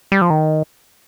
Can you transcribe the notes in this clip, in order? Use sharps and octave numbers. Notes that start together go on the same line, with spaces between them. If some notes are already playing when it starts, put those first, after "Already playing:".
G3
F3
D#3